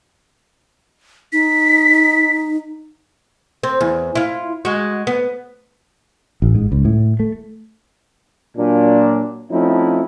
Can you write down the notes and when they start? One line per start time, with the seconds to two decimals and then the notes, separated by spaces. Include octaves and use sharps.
1.33 D#4 B6
3.63 C4
3.81 E2
4.15 E4 F4
4.65 G#3 F#4
5.07 B3
6.42 A1
6.55 G#2
6.72 C#2
6.85 A2
7.20 A3
8.57 A#2 F#3 D4
9.51 F3 A3 C4 C#4 D#4 E4